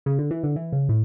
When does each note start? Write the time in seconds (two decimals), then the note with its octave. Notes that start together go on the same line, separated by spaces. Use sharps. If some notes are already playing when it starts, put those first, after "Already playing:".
0.06 C#3
0.19 D3
0.31 E3
0.43 D3
0.56 E3
0.72 C#3
0.89 A2